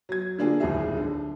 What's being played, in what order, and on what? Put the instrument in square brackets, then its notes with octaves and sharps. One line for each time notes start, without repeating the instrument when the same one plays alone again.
[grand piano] F#3 G#6
D3 A#3 D4 F4 G#4
D1 G#1 D#2 G3 G#4 E5
D3